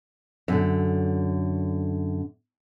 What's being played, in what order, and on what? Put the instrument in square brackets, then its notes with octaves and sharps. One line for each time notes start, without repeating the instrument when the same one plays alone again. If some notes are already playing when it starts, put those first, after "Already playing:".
[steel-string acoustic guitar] F#2 D3